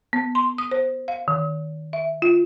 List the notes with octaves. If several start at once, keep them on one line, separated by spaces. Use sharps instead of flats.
B3
C6
D#6
C5
F5
D#3
E5
F4